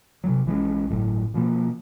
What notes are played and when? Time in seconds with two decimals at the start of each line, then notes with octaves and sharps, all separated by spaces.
0.24 C3 F#3
0.46 A#1 E3 G#3 C#4
0.90 G1 A2 F#3
1.34 B2 F3 A#3